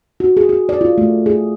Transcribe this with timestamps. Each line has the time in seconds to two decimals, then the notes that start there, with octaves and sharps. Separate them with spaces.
0.20 F#4
0.37 G#4
0.49 G#4
0.69 D5
0.81 F4
0.98 A3
1.26 G#4